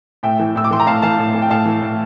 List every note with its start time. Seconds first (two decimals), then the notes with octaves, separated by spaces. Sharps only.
0.23 A2 E5 G5
0.39 E3
0.56 A2 E6
0.64 D6
0.71 E3 C6
0.80 A#5
0.86 A2 F5 A5
1.02 E3 F5 A5
1.19 A2
1.34 E3
1.42 G5
1.50 A2 F5 A5
1.66 E3
1.82 A2